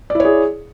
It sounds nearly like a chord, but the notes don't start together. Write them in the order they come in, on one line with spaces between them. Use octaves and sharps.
D5 E4 C#5 G#4